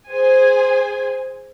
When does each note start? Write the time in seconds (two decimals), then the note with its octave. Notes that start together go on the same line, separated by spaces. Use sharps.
0.10 G#4 C5 G#5